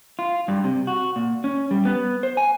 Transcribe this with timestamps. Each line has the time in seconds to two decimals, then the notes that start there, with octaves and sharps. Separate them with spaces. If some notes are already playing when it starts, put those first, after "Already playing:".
0.19 F4
0.48 G2
0.64 C3
0.87 F#4
1.16 A#2
1.44 C#4
1.71 G3
1.85 B3
2.23 C5
2.37 G#5